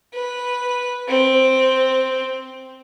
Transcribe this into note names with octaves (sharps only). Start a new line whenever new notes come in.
B4
C4